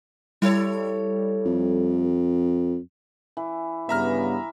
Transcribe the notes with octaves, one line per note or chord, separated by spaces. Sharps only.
G3 E4 A4 C#5
F2
E3
G2 C#3 B3 E5 A#5 F6